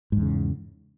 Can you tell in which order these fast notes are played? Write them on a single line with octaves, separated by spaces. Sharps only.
G#2 E2 C#3